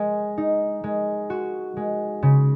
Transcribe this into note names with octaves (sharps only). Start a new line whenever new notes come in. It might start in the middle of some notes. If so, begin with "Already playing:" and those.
Already playing: G#3
D#4
G#3
F#4
G#3
C#3